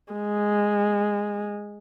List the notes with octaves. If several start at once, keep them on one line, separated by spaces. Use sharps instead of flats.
G#3